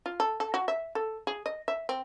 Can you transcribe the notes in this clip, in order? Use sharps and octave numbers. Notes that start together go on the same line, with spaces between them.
F4
A4
A4
F#4
E5
A4
G#4
D#5
E5
C4